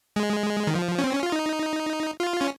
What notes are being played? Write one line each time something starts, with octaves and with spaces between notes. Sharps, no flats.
G#3
D#3
F3
C#4
C4
C#4
F4
D#4
F4
C#4